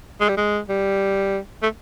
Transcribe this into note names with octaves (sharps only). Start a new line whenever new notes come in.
G#3
G3
G#3
G3
A3